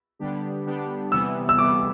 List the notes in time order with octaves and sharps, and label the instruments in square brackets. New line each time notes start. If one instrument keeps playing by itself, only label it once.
[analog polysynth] D3 G3 B3 D4 G4
D3 G3 B3 D4 G4
[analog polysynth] C3 E3 G3 B3 [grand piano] E6
[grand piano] E6
[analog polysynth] C3 E3 G3 B3 [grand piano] D6